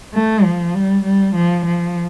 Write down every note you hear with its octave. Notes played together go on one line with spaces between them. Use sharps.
A3
F3
G3
G3
F3
F3